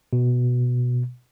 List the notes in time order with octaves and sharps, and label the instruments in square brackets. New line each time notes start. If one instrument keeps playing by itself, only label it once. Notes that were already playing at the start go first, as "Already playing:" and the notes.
[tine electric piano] B2